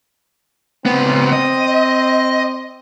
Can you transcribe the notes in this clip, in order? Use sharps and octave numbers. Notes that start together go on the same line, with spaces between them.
C#2 B3 C4
D#5